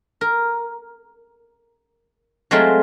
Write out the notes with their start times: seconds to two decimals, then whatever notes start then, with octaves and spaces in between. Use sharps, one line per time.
0.21 A#4
2.51 F#3 G#3 A3 C4 F4